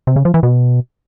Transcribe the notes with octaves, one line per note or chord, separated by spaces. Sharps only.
C3
C#3
F3
E3
B2